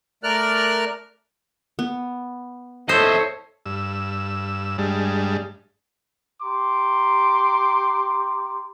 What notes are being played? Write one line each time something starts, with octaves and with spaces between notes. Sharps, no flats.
A3 A#4 D5 F6 F#6
B3
A4 C5 C#5 D#5 E5
G2 E6
G2 G3 G#3 D4
G4 A#5 C6 D6